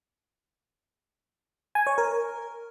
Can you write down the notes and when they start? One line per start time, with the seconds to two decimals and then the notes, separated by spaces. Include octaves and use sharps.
1.75 G#5
1.87 C#5
1.98 A#4